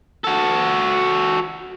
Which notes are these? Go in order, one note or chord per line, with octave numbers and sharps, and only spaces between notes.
F#4 A4